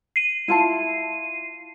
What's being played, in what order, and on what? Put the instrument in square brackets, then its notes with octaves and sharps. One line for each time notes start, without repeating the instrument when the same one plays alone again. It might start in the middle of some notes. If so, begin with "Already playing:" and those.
[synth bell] C7 D#7
[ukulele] E4 F4 A5